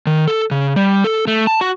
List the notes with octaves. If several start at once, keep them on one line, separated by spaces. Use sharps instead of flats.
D#3
A4
C#3
G3
A4
A3
A5
F#4